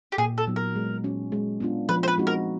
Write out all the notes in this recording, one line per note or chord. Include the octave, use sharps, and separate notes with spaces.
G4
A#2 G#4
A4
F#3 B3 D#4
A#4
G#3
C#4 F#4
G#3
B3 D4 F4
F3 B4
C5
B4
G#3 C4 D#4 F#4
A#4